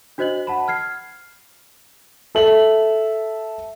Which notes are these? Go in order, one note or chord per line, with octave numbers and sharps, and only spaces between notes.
D4 F#4 C5 D#5 F#6 F#7
F#5 A5 B5
F6 G#6 C7
A4 E5 F#7